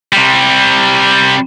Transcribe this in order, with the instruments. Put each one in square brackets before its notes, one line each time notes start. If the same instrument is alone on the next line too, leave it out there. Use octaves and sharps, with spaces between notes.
[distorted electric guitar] C3 G3